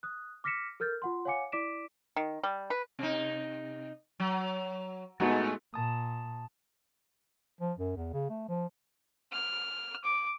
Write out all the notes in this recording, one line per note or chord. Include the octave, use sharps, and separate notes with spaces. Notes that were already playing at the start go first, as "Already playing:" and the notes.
D#6 F#6
D6 F6 A#6 B6 C#7 E7
A4 A#4 F6 G6 A6
F4 F#5 C6
C#5 F5 F#5 G#5 D6 C#7
E4 D5 D6 B6 D7 E7
D#3
G3
B4
C3 D#4
F#3
A2 G#3 A3 B3 D#4 F#4
A#2 A5 D#6
F3
F#2
E2
C#3
A3
F3
F6
D6